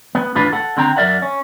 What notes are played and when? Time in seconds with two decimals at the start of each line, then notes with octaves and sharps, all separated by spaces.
0.15 B3
0.35 E2 A2 D4 F4 B4
0.52 A4 F#5
0.77 D3 C4 G5 A#5
0.96 F#2 A#4 D5 E5 F#5
1.22 C#4